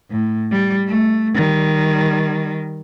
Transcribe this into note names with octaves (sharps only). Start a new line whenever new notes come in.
A2
G3
A3
D#3 G3